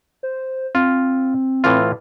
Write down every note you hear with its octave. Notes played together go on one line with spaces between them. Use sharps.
C5
C4 F4
A2 E3 F4